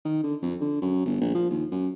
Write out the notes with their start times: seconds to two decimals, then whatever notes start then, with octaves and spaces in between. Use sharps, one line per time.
0.05 D#3
0.24 D3
0.42 F2
0.61 D3
0.81 F#2
1.05 G1
1.21 A#1
1.35 F3
1.51 D#2
1.71 F#2